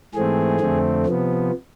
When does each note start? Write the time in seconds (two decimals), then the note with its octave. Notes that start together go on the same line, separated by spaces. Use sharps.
0.14 G#2 E3 A3 C4 G#4
0.60 F2 D3 A3 C4
1.06 C3 F3 B3